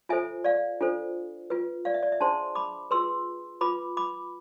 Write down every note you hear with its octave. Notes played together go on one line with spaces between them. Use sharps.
F4 A4 C5 E5 G#5
D5 F5
D4 F4 A4 C5
F4 B4
D5 F5
E5
D5
E5
D4 G#4 C5 A5 C6
B5 D6
F4 G#4 B4 C6 E6
F4 B4 B5 D6
B5 D6